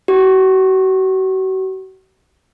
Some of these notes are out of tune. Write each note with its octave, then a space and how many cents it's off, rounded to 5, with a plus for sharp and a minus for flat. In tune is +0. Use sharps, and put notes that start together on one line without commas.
F#4 +40